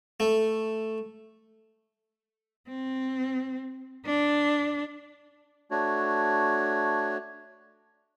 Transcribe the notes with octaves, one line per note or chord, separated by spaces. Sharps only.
A3
C4
D4
A3 D4 F#4 C#5